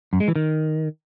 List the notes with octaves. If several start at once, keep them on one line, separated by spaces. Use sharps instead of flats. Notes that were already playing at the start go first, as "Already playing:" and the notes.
F#2
G#3
E3
D#3